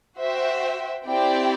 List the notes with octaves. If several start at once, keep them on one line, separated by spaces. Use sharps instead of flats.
F#4 C5 E5 G5
C4 E4 G4 D5 G5